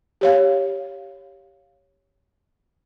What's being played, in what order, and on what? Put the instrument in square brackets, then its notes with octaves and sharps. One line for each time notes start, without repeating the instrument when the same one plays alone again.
[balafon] G4 C#5 F5